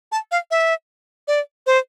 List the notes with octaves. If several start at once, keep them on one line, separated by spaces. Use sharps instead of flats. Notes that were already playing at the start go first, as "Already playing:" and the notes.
A5
F5
E5
D5
C5